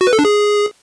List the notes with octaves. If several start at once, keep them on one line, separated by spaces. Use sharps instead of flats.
F#4
B4
A4
D4
G#4